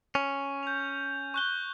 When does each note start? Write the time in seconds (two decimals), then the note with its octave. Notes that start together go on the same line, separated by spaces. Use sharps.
0.15 C#4
0.63 G6 F7
1.34 C#6 F#6 G7